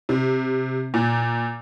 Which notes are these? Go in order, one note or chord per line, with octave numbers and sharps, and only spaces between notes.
C3
A#2